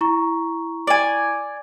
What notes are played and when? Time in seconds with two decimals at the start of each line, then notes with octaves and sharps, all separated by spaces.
0.01 E4 A#5 C#6
0.87 D5 G#5